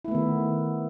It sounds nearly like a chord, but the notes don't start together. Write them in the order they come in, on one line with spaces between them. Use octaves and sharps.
E4 A3 B3 D#3